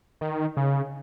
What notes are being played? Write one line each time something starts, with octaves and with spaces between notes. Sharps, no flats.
D#3
C#3